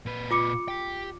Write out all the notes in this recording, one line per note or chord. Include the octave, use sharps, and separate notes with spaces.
A#2 B4
F4 D6 C#7
G4 G5